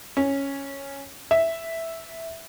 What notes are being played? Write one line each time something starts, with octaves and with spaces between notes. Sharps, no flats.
C#4
E5